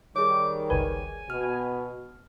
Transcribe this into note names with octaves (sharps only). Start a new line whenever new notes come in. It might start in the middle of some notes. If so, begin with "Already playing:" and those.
D#3 G3 G#4 C#5 D6
G1 C#2 B4 G#5
B2 F6